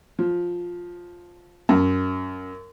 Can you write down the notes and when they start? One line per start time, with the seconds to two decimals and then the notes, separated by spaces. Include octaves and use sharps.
0.19 F3
1.69 F#2